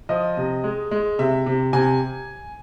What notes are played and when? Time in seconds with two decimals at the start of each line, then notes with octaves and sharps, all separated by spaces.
0.09 F3 D#5
0.37 C3
0.64 G#3
0.91 G#3
1.19 C3 E5
1.46 C3
1.73 C3 G#5